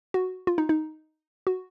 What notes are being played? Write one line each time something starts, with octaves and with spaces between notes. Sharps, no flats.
F#4
F4
D#4
D#4
F#4